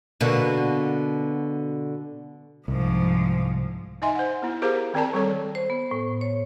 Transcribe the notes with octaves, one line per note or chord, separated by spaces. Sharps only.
B2 D3 A#3
C2 G#2 F3
D#4 D#5 E5 G#5 C6
C5 F#5
B3 E4
G4 G#4 A#4 C5 F5 A#5
D#3 C4 D5 A5 A#5
G3 A4 C#5
C5
B3
A2
C#5